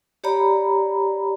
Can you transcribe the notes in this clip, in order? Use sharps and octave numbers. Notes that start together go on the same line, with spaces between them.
G4 C#5 D5 A#5 B5